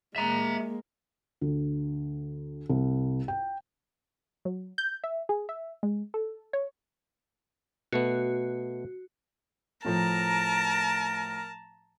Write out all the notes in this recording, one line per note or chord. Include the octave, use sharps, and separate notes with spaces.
G#3 A#3 E5 A#5
D2
C2
G5
F#3
G6
E5
G#4
E5
G#3
A4
C#5
B2 A3 B3 F#4
A2 F3 A#4 A5 A#5